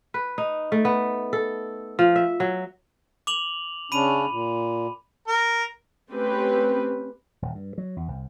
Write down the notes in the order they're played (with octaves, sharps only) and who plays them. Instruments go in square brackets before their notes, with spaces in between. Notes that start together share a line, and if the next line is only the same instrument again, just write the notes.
[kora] B4
D#4
A3
B3
A4
F3
E5
F#3
[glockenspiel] D6 F7 F#7
[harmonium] C#3 C#4 D4 [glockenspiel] B5 D#7
[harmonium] A#2
[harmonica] A#4
[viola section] A3 C4 C#4 G4 B4
[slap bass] D#1
G2
F#3
E2
C2